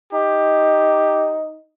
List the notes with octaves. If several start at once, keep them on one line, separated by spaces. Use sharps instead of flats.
D#4 G4